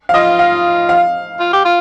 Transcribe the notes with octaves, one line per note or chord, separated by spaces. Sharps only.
F5
F4 D#5
F5
F5
F4
G4
F4